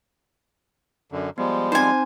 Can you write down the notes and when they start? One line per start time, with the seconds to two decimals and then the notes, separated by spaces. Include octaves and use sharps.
1.12 F#2 D3
1.38 F3 G3 G#3 B3
1.72 C4 D#4 C5 G#5